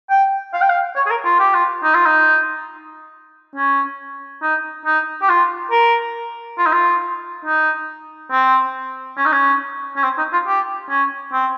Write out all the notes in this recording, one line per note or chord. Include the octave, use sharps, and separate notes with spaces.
G5
F5
G5
F5
C#5
G#4
A#4
F4
G4
F4
D#4
F4
D#4
C#4
D#4
D#4
G4
F4
A#4
F4
D#4
F4
D#4
C4
C#4
D#4
C#4
C#4
C4
D#4
F4
G4
C#4
C4